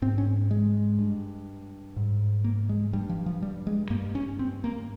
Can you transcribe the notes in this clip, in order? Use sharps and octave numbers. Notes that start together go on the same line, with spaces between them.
G#2 C4
C#4
G#3
G2
G#2
A#3
G#3
G2 G3
F3
F3
G3
G#3
G2 A#3
C#4
C4
A#3